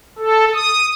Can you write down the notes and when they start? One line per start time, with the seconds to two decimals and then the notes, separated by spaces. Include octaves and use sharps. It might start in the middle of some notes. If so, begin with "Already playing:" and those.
0.18 A4
0.54 D#6